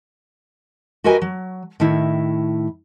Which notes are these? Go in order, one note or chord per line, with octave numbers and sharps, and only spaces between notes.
F#4 G4 A#4 B4 D#5 G#5
F#3
A2 D#3 E4